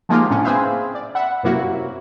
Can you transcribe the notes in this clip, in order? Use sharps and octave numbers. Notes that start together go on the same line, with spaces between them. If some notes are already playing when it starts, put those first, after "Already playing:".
F3 G#3 A#3 D#4 F4 G4
A2 C3 C#4 D4
C4 G#4 B4 C5 E5 F5
D5
E5 F#5 B5
F#2 C3 F#3 A#3 E4 F#4